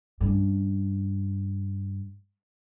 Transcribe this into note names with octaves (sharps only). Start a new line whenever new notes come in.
G2 C#4